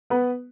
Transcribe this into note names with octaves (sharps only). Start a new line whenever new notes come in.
B3 B4